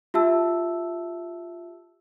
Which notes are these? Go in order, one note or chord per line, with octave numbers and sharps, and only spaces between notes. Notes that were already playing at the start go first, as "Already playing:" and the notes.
F4 G4 E5 A5 E6